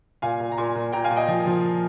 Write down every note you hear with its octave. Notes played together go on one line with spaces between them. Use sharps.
A#2 F5 G#5
A#2
A#5
A#2 G#5 C6
A#2
A#2 G5 A#5
F5 G#5
A#2
D#5 G5
F3
F3